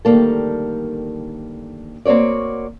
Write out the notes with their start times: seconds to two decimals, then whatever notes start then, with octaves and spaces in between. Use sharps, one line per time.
0.05 D2 D#3 G3 A#3 A4
2.05 A#3 C4 F#4 C#5 D5